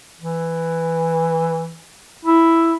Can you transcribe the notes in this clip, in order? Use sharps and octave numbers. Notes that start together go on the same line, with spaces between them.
E3
E4